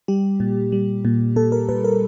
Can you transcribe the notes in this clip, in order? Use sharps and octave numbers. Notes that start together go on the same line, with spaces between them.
G3 G4
A#2
G3
A#2
A#2 A4
A#4
A#2 B4
A#4